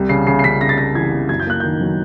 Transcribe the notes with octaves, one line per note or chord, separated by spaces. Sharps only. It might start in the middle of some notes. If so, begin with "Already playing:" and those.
Already playing: C2 G3
C#3 C7
C#3 C7
C7
C#3 B6
C#3 A#6
A6
C#3 A#6
E3 G#6
E3
F#2 G#6
G6
A#3 F#6
D#3 G6
F#3